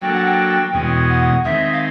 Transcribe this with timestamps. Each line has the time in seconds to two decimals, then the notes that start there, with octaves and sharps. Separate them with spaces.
0.02 F#3 A#3 D4 F#4 A4 G5
0.13 F#5
0.25 G5
0.73 E2 B2 G#3 C#4
1.09 F#5
1.45 D#3 G#3 C4 E5
1.72 F5